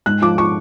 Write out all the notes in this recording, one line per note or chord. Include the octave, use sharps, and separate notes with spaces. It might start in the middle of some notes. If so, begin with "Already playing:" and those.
G#2 F#6
F3 D6
F3 C#6